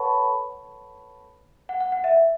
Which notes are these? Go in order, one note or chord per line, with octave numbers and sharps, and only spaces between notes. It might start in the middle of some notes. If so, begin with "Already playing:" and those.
Already playing: A4 B4 C#5 F#5 A5 B5 C#6
F#5
F#5
F#5
E5